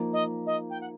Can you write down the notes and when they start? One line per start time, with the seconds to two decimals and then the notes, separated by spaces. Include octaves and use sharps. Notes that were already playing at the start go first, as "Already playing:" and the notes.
Already playing: F3 A#3 D#4
0.12 D#5
0.46 D#5
0.70 G5
0.81 F#5